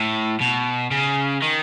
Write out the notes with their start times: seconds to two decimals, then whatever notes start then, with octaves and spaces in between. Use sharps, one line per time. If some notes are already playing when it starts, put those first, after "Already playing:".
Already playing: A2
0.40 B2
0.91 C#3
1.42 D#3